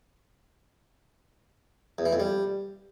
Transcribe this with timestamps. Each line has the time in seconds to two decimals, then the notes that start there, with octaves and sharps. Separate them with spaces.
1.98 E2
2.06 E3
2.13 F2
2.20 G3